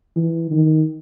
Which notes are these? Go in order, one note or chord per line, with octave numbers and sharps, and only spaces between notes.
E3
D#3